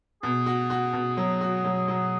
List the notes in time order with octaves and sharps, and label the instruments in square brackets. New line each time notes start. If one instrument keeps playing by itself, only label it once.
[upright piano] B2 [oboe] G#4
[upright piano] F#4
F#4
B2
F#3
F#4
F#3
F#3